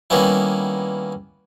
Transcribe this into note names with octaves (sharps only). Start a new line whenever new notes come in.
D#3 G3 A#3 B3 C#4 E4